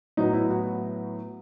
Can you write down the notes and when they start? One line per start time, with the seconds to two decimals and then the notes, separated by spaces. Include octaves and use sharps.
0.17 A2 F#3 B3 D#4
0.33 E4
0.50 F#4